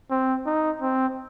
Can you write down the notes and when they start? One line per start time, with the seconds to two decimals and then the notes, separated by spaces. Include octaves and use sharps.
0.10 C4
0.46 D#4
0.82 C4